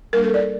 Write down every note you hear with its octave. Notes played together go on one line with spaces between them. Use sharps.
G3 A#3 D4 A#4
A4
D5